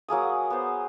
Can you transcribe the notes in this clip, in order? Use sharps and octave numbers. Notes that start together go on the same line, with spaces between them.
F#3 A#3 G#4 D#6
B3 C5